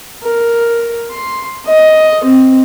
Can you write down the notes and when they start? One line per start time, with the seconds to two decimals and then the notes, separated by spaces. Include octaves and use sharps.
0.23 A#4
1.10 C6
1.66 D#5
2.24 C4